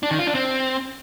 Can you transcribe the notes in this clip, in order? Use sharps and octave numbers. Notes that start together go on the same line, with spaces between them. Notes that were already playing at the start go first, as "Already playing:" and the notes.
D4
D#3
F4
D4
C4